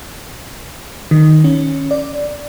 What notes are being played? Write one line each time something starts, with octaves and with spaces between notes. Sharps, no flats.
D#3
C#4
D5